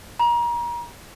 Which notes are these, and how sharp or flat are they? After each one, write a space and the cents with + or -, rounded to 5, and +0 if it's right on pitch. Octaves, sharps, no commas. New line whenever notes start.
A#5 +30